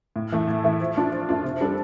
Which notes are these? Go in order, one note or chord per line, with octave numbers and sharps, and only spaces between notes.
A2
E3 A3 E4
A2
E3 A3 E4
F3
A3 D4 F4
F3
A3 D4 F4
C3
G3 D4 A4